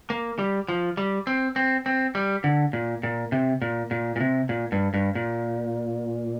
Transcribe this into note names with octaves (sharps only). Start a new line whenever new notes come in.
A#3
G3
F3
G3
C4
C4
C4
G3
D3
A#2
A#2
C3
A#2
A#2
A#2
C3
A#2
G2
G2
A#2